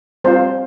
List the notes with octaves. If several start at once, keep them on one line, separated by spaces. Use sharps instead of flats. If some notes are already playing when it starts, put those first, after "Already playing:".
G3 C4 F4 C5